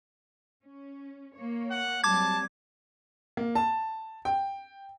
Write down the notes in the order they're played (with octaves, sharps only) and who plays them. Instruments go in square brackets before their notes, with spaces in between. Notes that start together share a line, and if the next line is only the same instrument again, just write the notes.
[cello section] C#4
A#3 C#5
[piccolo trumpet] F#5
[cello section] F#3 G3 C4 [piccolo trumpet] A5 [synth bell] D6 G#6
[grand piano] A#3
A5
G5